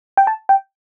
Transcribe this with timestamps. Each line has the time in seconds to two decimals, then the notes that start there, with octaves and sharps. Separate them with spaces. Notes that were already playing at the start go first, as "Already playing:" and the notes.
0.17 G5
0.27 A5
0.49 G5